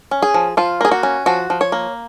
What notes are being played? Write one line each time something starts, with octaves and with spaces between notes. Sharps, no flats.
C#4
G#4
F3
F3 F4
A#3 G#4
F#4
C#4
F3 F#4
F3
C#5
A#3